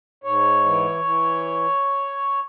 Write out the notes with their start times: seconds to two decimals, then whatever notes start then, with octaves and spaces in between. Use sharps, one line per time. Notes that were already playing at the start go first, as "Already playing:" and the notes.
0.24 G#2 C#5
0.65 E3
1.04 E3